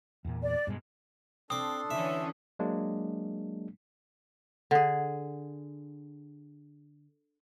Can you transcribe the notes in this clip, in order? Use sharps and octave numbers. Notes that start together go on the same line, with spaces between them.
E2 A#2
D5
G2 B2 G#3
C4 D4 A4 C6 D6 D#6
D3 E3 C#4 E5
F#3 G#3 A#3 D4
D3 G#4